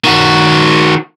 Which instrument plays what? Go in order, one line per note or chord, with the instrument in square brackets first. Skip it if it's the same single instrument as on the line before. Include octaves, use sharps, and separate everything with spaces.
[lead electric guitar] D#3 F#4